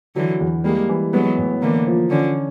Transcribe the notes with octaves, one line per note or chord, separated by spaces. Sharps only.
D3 E3 F#3
E2
G3 G#3 A#3
E3
F#3 G#3 B3
A2
D3 E3 A#3
F3
D3 C#4